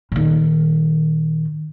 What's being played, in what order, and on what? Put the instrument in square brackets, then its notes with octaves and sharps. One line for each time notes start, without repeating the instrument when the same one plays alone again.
[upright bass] A#2 D#3